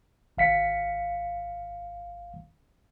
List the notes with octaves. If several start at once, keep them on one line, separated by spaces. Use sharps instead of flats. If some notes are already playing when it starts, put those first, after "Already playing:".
G#1 F5 B6 C#7